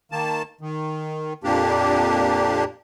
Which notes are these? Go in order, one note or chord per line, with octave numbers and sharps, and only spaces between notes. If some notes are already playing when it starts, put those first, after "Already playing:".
D#3 A#3 A5
D#3
F2 A#2 A#3 D4 G4